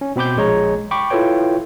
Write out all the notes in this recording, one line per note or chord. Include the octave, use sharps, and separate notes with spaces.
C#4
B2 C4 B5 D6 G6
A#1 G#3 C#5 A#5
G5 B5 C#6 D6
E4 F4 A4 B4 C#5 G5